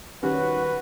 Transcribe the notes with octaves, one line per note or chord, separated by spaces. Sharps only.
D#3 G3 C#4 F#4 B4